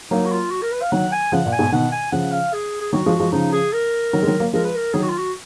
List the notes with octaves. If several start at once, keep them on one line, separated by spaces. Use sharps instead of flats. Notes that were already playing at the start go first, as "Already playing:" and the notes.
F#3 A#3 D#4
F#4
F4
F#4
A#4
B4
F5
D#3 F#3 F#5
G#5
C#3 F3 F#5
A#2
G#5
G#2 B2
B2 D#3 F#5
G#5
C#3 F3 F#5
F5
G#4
G#4
D#3 F#3 F#4
F3 G#3
F3 G#3
C#3 F3 D#4
G#4
A#4
D#3 F#3
G#3
D#3 F#3
F#3 A#3
F3 G#3 A#4
B4
A#4
D#3 F#3 G#4
F#4
F4
F#4